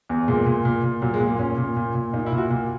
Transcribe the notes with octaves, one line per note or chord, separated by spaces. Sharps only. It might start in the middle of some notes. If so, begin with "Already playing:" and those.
E2
A#2 G#3
A#2
A#2
A#2
A#2 F#3
G#3
A#2
A#3
A#2 C#4
A#2
A#2
A#2
A#2 D#4
E4
A#2
F#4
A#2 A#3